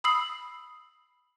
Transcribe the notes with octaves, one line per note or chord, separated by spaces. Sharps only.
B5 D#6 E6 C7 F#7